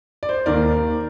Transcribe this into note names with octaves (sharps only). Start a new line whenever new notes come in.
D5
C5
D#2 D#3 A#4 D5